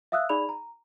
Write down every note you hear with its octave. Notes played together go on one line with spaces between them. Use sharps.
E5 F5 D#6 E6 F#6
D#4 G#4 D5 B5 F7
A#5